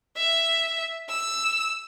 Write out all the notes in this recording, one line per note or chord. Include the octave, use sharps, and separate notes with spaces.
E5
E6